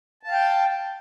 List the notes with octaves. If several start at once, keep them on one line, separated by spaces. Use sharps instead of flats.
F5 G5 A5